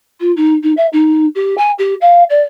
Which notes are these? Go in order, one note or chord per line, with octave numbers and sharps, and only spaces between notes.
F4
D#4
D#4
E5
D#4
G4
G#5
G4
F5
D5